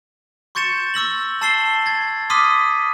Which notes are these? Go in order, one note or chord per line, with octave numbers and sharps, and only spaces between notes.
C6 C#6 G6 A6 C#7 E7
C#6 E6 A#6 F#7
A5 E6 A6 C7 E7 G7
G#6 A6
C6 D6 D#6 F6 B6 D#7